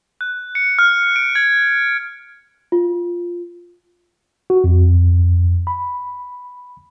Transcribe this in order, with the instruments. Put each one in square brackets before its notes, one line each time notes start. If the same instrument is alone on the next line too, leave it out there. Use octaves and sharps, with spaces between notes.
[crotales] F#6
C#7
F6
D7
G#6
[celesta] F4
[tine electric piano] F#4
F2
B5